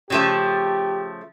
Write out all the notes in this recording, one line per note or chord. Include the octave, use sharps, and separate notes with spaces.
C#3 F3 A3 G4